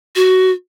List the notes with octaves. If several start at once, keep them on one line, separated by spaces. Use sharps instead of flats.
F#4